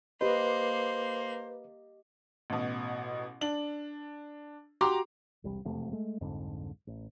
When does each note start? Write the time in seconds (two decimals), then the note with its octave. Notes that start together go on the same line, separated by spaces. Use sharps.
0.21 A#3 G4 B4 C5 D#5
2.50 A1 B2
3.41 D4 F#7
4.81 F#4 G4 A#5 C6 D6
5.44 E1 C2 G3
5.65 E1 F2 C3 A3
5.93 G#3 A3
6.21 C2 F2 G#2 D3
6.87 A1